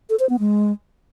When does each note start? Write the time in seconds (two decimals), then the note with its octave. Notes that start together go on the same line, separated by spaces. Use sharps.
0.10 A4
0.20 C5
0.29 B3
0.39 G#3